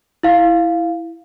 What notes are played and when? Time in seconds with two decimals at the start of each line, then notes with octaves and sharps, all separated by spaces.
0.23 E4 F5